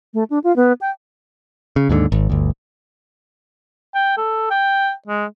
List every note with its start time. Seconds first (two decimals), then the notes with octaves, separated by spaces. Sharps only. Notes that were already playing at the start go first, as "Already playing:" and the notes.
0.14 A3
0.30 D4
0.44 F4
0.56 B3
0.81 G5
1.76 C#3
1.89 D#2 G#2 B2 D3
2.12 G#1
2.30 G1 D2
3.95 G5
4.17 A4
4.51 G5
5.07 G#3